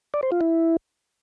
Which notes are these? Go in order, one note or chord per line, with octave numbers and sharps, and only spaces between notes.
D5
C5
F4
E4